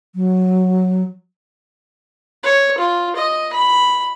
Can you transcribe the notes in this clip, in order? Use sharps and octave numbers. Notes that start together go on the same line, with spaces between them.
F#3
C#5
F4
D#5
B5